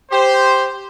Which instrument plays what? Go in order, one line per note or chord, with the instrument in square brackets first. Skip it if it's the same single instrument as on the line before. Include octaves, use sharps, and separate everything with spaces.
[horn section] G4 C5